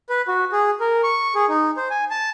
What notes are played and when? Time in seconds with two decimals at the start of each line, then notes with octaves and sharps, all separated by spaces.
0.09 B4
0.28 F#4
0.52 G#4
0.80 A#4
1.04 C#6
1.35 G#4
1.49 D#4
1.77 C5
1.90 G#5
2.10 A5